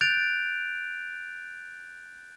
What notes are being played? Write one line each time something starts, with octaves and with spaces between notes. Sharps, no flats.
F#6 G6 A6 D7 F7